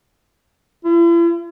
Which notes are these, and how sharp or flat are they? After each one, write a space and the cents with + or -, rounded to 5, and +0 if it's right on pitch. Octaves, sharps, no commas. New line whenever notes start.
E4 +45